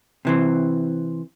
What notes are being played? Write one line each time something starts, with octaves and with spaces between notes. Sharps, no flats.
C3 E3 C4